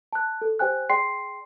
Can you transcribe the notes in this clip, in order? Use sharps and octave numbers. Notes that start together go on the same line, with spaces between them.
A5 F#6
A4
G4 C5 G5 G#5 F#6
G#4 D5 G5 C6 C7